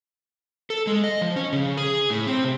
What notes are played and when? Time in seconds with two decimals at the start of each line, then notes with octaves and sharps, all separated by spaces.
0.70 A4
0.87 G#3
1.04 D#5
1.22 F3
1.36 C#4
1.53 C#3
1.77 G#4
2.10 A2
2.27 C4
2.44 C3